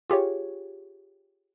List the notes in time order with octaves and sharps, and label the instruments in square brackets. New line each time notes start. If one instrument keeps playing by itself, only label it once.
[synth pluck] F4 G4 G#4 C#5